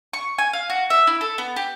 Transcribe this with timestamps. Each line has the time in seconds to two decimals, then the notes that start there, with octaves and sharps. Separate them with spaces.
0.13 C#6
0.38 G#5
0.53 F5
0.70 F#4
0.90 E5
1.07 E4
1.21 A4
1.38 B3
1.56 G4